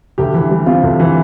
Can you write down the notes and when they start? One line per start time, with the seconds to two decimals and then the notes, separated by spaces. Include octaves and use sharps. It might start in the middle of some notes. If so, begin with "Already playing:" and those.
0.18 D2 G4
0.34 E3
0.51 G3
0.66 C3 F4
0.83 D2
1.00 E3